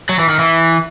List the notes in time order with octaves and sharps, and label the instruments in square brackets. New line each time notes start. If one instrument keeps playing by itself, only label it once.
[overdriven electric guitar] F#3
E3
D#3
E3